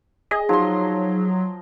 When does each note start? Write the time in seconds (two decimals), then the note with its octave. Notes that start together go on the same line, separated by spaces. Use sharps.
0.31 G#4 D#5
0.49 F3 F#3 D#4 C6